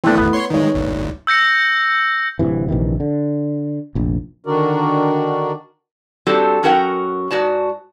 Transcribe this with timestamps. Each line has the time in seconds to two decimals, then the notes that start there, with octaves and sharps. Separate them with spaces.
0.04 E3 A3 B3 C4 D4 E4
0.18 G1 D#2 B3
0.33 C#5 C6
0.50 D#3 G#3 D#4 C#5
0.74 G1 D2
1.27 E6 G6 A#6 C#7
2.39 D1 C2 C3 E3
2.68 A#1 C3 D#3 E3
3.00 D3
3.95 F1 A#1
4.46 D3 D#3 D4 F#4 A#4 D5
6.27 G3 C4 D4 F#4 G4 A4
6.63 F#2 C#4 F#4 A#4 F#5 G5
7.31 G#2 F#4 D5 A5